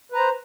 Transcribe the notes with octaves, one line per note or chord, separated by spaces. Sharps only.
B4 C5 A#5